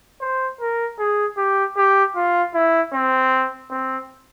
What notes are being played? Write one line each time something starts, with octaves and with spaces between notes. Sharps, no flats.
C5
A#4
G#4
G4
G4
F4
E4
C4
C4